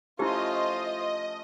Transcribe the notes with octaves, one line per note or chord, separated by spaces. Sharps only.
F3 A3 C#4 E4 F4 G4 C5 D#5